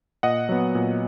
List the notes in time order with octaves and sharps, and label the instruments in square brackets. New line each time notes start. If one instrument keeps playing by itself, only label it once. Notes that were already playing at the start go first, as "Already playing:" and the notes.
[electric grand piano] A#2 D#5 F#5
F#3 B3
A#2